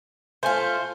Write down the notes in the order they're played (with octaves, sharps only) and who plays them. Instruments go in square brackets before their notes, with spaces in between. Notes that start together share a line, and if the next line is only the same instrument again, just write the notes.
[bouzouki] A3 F4 [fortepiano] C5 G#5